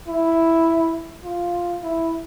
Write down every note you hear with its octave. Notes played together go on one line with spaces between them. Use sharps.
E4
F4
E4